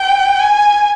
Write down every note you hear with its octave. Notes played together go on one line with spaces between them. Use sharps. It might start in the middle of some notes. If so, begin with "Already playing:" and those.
Already playing: G5
G#5